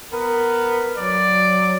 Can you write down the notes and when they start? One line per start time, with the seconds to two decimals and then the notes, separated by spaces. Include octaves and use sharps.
0.13 B3 A#4
0.97 F#3 D5